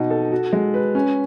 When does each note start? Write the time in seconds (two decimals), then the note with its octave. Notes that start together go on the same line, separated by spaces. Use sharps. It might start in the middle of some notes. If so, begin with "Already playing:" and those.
Already playing: B2 D#4
0.10 A4
0.32 F#4
0.53 G#3
0.74 B4
0.95 C#4